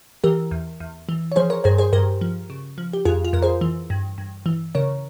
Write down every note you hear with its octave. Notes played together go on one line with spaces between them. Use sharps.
E3 G4 A#4
E2
E2
E3
C#5
F3 G#4 C5
A#4 C#5
G2 G#4 C5
G#4 C5
G2 G4 A#4
F3
C#3
F3
G4
F2 F4 G#4
F4
F2 A#4
G#4 C5
E3
G2
G2
E3
C#3 A#4 C#5